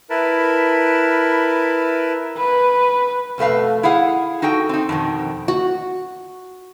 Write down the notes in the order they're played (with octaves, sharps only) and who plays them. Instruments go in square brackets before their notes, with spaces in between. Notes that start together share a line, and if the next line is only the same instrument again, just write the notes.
[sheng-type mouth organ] E4 A#4 B4 A5 B5
[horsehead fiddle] B4
[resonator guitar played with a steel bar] F2 B2 A3 B4 F5
E4 G#4 F5 F#5
D#4 F#4 A4 G5
C4 D#4
F2 B2 D#3
[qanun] F#4